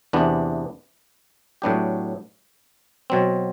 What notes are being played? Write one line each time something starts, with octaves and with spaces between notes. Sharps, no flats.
E2 C3 E3 B3 D4
A2 F#3 B3 D4 G4
B2 F#3 C4